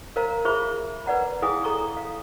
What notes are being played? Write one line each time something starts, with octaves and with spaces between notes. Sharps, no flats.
A#4 C5 F5 A#5
F4 G#4 C5 E5 B5 C#6
B4 D5 F#5 A#5
E4 G#4 F5 G5 G#5 D#6
A4 A#5 C#6
F5